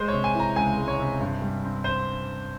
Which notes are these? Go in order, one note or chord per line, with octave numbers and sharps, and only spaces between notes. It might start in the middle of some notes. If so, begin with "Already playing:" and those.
Already playing: G#3 C5
C3 C#5
G#5
E3 A#5
C#2 G#5
G#3
C#5
C3
G2
G3
C4
C5